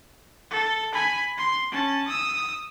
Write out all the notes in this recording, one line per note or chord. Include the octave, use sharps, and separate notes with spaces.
A4
G#5 B5
C6
C#4 A5
D#6 E6